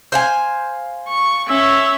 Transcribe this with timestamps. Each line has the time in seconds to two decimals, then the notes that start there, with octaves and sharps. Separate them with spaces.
0.12 C5 F5 G#5
1.09 C#6
1.48 C#4 E5 E6